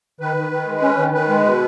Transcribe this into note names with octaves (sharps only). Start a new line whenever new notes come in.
D#3 B4
D#3
D#3
G#3
C#4
D#3
D#3 B4
G#3
B2